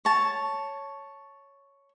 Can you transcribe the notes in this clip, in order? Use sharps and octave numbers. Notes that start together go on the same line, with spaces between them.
C#5 A5